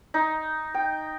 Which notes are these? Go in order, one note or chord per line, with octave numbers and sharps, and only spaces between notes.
D#4
G5